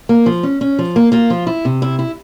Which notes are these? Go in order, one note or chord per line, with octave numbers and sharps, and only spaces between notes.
A#3
F3
C#4
C#4
F3
A#3
A#3 F4
F3
E4
C3
E4
E4